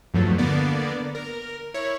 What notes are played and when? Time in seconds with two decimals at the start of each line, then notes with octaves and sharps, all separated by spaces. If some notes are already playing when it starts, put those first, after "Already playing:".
0.14 E2 G2 F3 F#3 A3
0.38 D3 A#3 B3 D5
1.15 A#4
1.74 E4 C#5